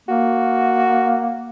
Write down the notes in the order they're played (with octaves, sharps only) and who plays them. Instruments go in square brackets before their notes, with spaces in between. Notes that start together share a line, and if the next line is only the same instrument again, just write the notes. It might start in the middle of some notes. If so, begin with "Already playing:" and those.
[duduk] A#3 [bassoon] F#4